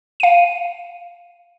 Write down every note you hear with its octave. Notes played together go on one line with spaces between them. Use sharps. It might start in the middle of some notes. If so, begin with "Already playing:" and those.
F5 D#7